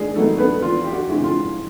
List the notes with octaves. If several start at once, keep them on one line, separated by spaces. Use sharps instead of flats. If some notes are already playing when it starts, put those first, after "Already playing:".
Already playing: D#2 G3 G#3 G#4
D#3 F#3 A3 B3 D#4 A4
B3 B4
E2 F4
G4
F#4
C#3 E3 G#3 C4
F4